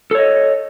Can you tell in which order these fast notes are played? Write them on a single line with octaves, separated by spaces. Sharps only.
A4 C#5 D#5